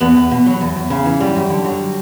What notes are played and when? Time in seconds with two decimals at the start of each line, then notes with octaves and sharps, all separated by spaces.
0.01 E2 B3
0.16 E2
0.31 B2
0.46 F#3
0.61 E2
0.76 E2
0.90 C#3
1.06 E3
1.20 F#2 G3
1.36 F#2
1.50 D3
1.65 F#3